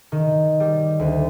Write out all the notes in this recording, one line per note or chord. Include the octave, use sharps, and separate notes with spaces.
D#3
G3
D2